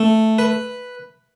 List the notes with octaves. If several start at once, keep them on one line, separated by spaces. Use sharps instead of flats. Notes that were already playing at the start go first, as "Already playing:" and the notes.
Already playing: A3
B4